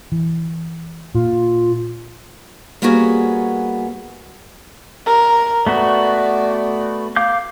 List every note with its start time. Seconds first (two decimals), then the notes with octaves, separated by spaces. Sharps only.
0.12 E3
1.15 A#2 F4
2.82 G3 A#3 B3 C#4 F#4 G#4
5.06 A#4
5.67 A3 B3 F#4 D5
7.16 F5 D6 G6